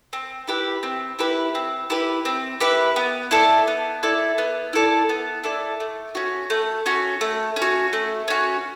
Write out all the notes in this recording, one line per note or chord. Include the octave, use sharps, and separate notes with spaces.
C4
E4 G4 B4
C4
E4 G4 B4
C4
E4 G4 B4
C4
E4 G4 B4
B3
E4 A4 D5
B3
E4 A4 D5
B3
E4 A4 D5
B3
E4 A4 D5
A3
C#4 F#4
A3
C#4 F#4
A3
C#4
F#4
A3
C#4 F#4